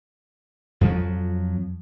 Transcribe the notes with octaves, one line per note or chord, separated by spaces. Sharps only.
F2 F3 F#3